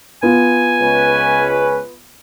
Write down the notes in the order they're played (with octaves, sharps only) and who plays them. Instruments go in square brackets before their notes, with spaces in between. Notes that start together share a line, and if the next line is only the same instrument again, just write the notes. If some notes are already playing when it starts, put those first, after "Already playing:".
[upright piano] B3 F4 [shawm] G#5
[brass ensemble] C#2 C#4 B4